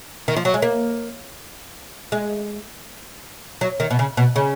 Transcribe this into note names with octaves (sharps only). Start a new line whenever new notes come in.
D#3
F3
F#3
G#3
A#3
G#3
F#3
D#3
B2
C#3
B2
C#3